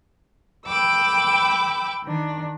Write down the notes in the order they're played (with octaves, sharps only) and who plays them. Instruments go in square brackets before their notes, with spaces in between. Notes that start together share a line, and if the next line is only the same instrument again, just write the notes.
[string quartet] G5 B5 D6 E6
D#3 D4